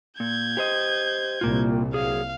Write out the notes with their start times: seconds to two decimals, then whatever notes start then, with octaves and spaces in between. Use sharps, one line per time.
0.20 A#2 G6 G#6
0.57 G4 C5 D#5
1.41 C2 A#2 A#3 F4
1.94 F#3 G#4 F5